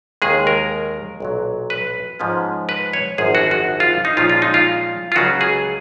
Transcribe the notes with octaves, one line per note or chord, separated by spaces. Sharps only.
D#2 D#3 G#3 G#4
A#4
B1 A#2 F#3
B4
G#2 F3 G#3 C#4
B4
C#5
G#1 F#2 F3 B3 G#4
F#4
F#4
F4
D#4
A#2 F3 G#3 C#4 F4
F4
D#4
F4
F4
C#2 C#3 F#3 C#4 F#4
G#4